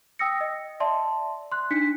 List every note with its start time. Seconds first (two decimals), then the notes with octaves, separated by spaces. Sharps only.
0.19 G5 D#6 E6 A#6 C#7
0.41 D#5
0.80 D5 E5 A5 C6
1.52 C6 F#6
1.71 D4 D#4 B6 C#7